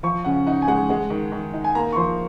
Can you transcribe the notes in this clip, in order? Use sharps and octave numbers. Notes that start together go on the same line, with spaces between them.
F3 C#6
C#3 F#5
D#4 F#5
G#5
G#3 F#5
G#3 F#5
D#3
D#3
D#4
G#5
A#3 A#5
C#6
F3 C6